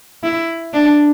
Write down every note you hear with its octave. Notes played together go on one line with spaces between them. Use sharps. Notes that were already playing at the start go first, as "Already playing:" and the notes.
E4
D4